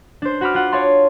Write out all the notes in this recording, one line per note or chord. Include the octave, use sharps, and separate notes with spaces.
D4 C5
F#4 F#5 B5 D6 F6
F4 F#5
C#5 D5 F5 A5 C6